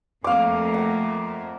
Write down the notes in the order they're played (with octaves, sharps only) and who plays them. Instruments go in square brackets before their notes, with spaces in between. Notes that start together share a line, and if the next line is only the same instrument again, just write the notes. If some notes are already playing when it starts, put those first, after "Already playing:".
[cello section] F2 A3 A#3 [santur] F5 D6
[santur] F#5